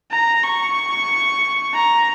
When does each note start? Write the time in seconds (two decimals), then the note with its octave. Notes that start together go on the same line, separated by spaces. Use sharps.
0.11 A#5
0.43 C#6
1.74 A#5